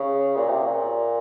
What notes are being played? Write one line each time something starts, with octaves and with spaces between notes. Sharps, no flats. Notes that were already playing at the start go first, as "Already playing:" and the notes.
Already playing: C#3
A#2
C3
A#2